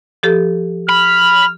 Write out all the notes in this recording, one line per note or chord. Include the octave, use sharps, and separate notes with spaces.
F3 G4 A4
B5 F6